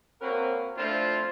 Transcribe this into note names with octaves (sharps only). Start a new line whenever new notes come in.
A#3 C4 F#4 A#4 B4 C#5
F3 A3 C4 D4 E4 F4